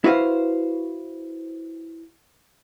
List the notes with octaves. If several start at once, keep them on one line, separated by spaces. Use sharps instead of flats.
E4 F#4 B4 C5 F5